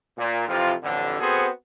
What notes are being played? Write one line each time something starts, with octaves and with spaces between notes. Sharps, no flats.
A#2
F2 C3 E3 F3 F4
A1 F2 D3
B3 C4 F#4 G#4 A4 C5